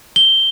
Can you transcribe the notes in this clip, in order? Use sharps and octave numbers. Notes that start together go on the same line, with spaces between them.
G7